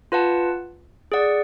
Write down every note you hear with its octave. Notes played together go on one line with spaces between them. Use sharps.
F4 B4 F#5 A5
G#4 D5 F#5